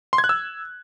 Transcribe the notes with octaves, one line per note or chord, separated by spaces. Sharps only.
C6
G#6
F#6
E6